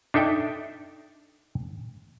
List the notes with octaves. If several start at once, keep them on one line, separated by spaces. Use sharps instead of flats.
D4 D#4 A4 E5 G5